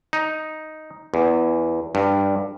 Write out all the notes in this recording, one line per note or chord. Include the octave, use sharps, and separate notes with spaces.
D#4
E2
G2